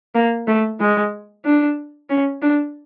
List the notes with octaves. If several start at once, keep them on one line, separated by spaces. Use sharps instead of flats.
A#3
A3
G#3
D4
C#4
D4